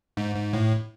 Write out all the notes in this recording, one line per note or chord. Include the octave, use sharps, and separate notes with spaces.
G#2
G#2
A2